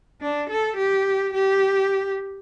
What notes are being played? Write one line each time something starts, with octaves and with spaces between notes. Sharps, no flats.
D4
A4
G4
G4